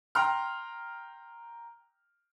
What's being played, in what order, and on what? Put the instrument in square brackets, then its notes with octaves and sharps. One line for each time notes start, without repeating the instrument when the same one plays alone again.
[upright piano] G5 A#5 C6 F6